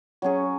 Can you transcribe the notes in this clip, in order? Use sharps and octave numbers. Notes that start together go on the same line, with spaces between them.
F#3 C#4 G#4